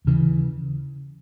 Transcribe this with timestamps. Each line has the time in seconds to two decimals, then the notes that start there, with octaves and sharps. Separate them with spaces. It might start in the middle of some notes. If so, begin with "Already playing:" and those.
0.05 D#2 C#3 E3